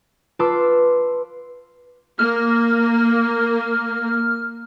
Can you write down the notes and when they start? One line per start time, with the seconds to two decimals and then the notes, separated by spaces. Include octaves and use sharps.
0.39 F4 B4 A5 C6 D6 E6
2.19 A#3 F6